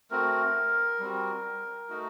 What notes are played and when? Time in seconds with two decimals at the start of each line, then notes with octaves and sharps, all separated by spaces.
0.11 A3 C4 F#4 A#4
1.00 G3 C4 F#4
1.90 A3 D#4 F#4